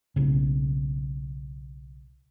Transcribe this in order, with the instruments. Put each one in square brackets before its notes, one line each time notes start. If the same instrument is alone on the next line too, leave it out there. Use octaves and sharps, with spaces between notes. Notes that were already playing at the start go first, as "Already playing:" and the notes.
[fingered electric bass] B1 C#3